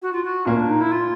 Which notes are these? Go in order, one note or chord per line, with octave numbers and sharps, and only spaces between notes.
F#4
F4
F#4
A#2 A#3 C#4
D4
D#4
E4
F4